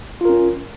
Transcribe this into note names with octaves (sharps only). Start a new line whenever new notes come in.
C#4 F4 A#4